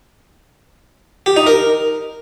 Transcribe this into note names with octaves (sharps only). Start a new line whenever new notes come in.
G4
D#4
A#4